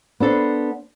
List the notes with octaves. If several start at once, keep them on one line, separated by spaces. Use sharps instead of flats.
B3 D4 A4 C5